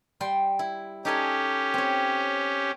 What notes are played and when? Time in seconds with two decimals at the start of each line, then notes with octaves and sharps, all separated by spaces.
0.20 G3 G5 C6
0.59 E4
1.05 C#4 D#4 G4 A4 G#5
1.74 C4 C#5